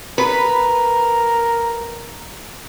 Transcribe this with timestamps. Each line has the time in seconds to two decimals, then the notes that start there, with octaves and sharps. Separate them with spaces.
0.18 A#4 B4